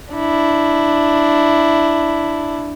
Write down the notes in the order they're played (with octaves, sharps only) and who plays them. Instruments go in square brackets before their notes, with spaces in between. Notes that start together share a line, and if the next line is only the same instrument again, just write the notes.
[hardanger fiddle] D4 E4